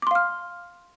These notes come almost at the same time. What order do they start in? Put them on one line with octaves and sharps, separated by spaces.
D6 C6 F5 F6